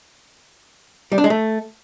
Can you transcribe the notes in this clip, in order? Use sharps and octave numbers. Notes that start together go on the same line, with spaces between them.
G3
D4
G#3
A3